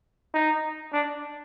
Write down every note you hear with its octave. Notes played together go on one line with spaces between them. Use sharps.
D#4
D4